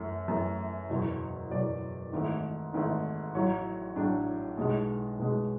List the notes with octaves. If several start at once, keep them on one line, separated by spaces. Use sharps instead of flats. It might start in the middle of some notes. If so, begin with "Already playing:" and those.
Already playing: F#2 E3 A3
F#2 E3 A3
F#1 E2 B2 F#3
F#1 E2 B2 F#3 D5
G#1 G#2 E3 A3
G#1 G#2 E3 A3
A1 A2 F#3 C#5
A1 A2 F#3 D4
B1 B2 G#3
B1 B2 G#3